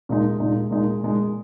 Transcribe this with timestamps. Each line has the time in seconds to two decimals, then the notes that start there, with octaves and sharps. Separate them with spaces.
0.09 A#2 G#3 D#4
0.40 A#2 G#3 D#4
0.71 A#2 G#3 D#4
1.03 A#2 G#3 D#4